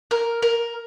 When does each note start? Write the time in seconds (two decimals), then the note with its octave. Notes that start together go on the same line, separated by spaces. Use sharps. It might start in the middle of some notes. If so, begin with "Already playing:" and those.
0.11 A#4
0.42 A#4